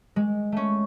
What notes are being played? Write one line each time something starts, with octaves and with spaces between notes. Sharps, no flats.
G#3
A3 C#4